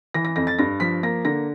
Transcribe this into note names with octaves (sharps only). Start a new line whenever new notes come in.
E3 A#6
A#6
F2 A#6
A6
G2 A#6
F3 B6
A#3 A#6
D3 A#6